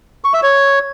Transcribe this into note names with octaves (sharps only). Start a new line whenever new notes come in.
C#6
E5
C#5